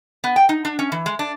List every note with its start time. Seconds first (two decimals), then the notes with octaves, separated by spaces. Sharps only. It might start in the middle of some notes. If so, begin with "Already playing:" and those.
0.24 B3
0.36 G5
0.49 D#4
0.65 D4
0.79 C#4
0.92 E3
1.06 G#3
1.19 D4